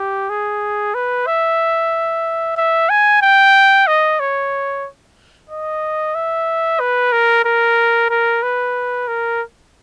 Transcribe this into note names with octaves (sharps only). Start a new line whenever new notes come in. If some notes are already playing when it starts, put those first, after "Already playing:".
Already playing: G4
G#4
B4
E5
E5
G#5
G5
D#5
C#5
D#5
E5
B4
A#4
A#4
A#4
B4
A#4